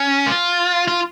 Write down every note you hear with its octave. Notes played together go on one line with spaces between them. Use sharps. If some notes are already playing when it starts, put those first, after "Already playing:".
Already playing: C#4
F4
F4